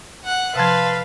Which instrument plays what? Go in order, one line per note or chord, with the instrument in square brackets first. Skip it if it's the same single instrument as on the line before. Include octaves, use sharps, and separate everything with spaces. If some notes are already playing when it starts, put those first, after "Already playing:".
[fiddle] F#5 F#6
[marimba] C3 F3 [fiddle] B4 [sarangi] F5 [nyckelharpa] A5 C6